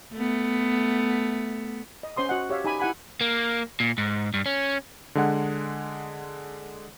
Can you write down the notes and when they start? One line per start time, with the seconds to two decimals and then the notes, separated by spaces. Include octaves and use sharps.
0.13 A3 B3
2.03 D#5
2.17 C#4 C5 C6 D#6
2.29 F#4 D#5 F#5
2.49 G4 C#5 E5 F5
2.64 D#4 G4 G#5 A#5 B5
2.79 E4 G4 F#5 G#5 B5
3.21 A#3
3.80 A#2
3.98 G#2
4.34 G2
4.46 C#4
5.15 D3 G#3 F#5